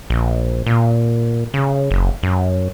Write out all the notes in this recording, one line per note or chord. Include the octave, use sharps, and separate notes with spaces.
A#1
A#2
C#3
F#1
F#2